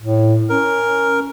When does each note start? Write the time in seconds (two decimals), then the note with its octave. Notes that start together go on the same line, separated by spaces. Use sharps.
0.01 A2
0.49 C#4 A#4